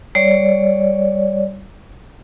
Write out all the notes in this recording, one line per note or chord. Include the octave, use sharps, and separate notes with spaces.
G3 C#5 D5